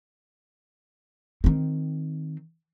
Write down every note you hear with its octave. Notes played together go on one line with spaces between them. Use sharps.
D#3 C4